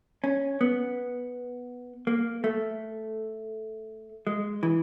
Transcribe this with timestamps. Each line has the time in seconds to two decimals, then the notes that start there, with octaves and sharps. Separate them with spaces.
0.24 C#4
0.61 B3
2.07 A#3
2.44 A3
4.27 G#3
4.63 E3